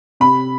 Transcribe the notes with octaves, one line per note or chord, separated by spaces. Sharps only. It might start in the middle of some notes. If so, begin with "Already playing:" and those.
C3 B5